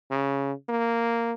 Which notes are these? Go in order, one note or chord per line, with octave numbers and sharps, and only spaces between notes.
C#3
A#3